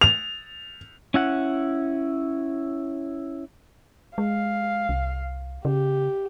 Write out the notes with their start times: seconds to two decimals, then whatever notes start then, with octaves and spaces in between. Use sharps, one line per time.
0.01 F7
1.14 C#4 E4 F#5
4.18 G#3 F5
4.89 C2
5.65 C#3 G4